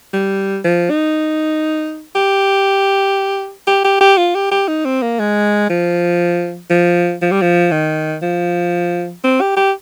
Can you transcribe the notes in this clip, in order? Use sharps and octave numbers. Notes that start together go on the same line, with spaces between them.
G3
F3
D#4
G4
G4
G4
G4
F4
G4
G4
D#4
C4
A#3
G#3
F3
F3
F3
G3
F3
D#3
F3
C4
G4
G4